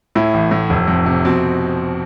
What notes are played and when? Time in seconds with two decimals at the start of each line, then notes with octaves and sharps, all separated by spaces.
0.15 A2 E4
0.34 A1
0.51 A2
0.70 F1
0.88 F2
1.06 C3
1.25 B2 C4